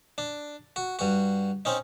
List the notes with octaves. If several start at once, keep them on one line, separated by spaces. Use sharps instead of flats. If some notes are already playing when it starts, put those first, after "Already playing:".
D4
F#4
G2 F#4
C4 C#4 D#4